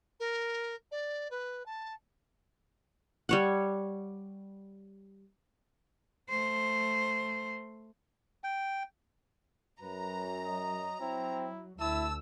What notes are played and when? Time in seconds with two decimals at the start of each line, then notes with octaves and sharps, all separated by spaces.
0.20 A#4
0.91 D5
1.31 B4
1.66 A5
3.29 G3 C#5 F#5
6.29 A3 C5
8.44 G5
9.81 F#2 F#3 B4 A#5
10.45 D#5
11.01 C4 E4
11.80 D2 E4 A5 E6